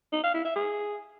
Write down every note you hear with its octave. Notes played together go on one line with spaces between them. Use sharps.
D#4
F5
E4
E5
G#4